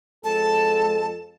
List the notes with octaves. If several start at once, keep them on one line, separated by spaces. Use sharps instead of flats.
F2 G#3 A4 A5